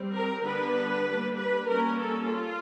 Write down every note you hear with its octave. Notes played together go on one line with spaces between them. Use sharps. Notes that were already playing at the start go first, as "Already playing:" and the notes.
Already playing: G3 C4
A#4
D3 G3 B3 D4 B4
G3 A#3 D4
B4
G3 A#3 C#4 A#4
A4
F4